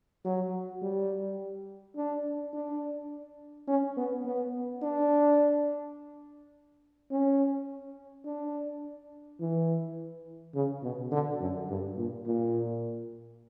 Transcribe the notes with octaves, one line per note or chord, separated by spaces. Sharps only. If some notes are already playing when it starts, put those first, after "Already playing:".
F#3
G3
D4
D4
C#4
B3
B3
D4
C#4
D4
E3
C#3
B2
D3
F#2
G2
A#2
A#2